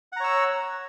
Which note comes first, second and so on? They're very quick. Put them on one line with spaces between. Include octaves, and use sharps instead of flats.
F#5 A#5 C#5 E6